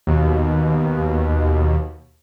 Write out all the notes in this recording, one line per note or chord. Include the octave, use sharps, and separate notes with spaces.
D#2 B2